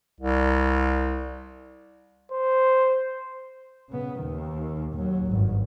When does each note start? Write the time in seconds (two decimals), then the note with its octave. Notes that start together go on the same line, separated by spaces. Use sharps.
0.20 C2
2.32 C5
3.90 C#3 B3
4.20 D#2 D#3
4.94 D#2 F#3
5.27 G#1 G2